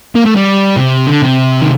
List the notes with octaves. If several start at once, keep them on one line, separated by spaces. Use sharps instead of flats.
A#3
A3
G3
C3
D3
C3
D#3